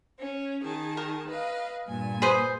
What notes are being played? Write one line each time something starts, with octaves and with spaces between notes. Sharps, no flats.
C#4
D#3 G#4 A5
A#4
B4 D#5 F5
G2 A#2 G#5
G#4 B4 C5